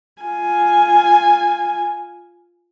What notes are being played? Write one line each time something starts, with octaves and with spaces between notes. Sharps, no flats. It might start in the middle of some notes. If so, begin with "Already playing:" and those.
F4 G#5